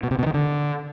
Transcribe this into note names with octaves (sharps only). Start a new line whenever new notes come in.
B2
C3
B2
D#3
D3